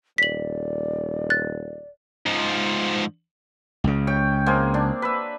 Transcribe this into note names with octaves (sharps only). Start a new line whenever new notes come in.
D#1 D5 B6 F#7
F#6 A6
G#2 F3
C#2 C#3
C#5 G5
G#3 A#3 C4
D4
B4 E5